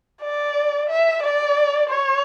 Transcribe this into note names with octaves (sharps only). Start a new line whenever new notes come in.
D5
E5
D5
C#5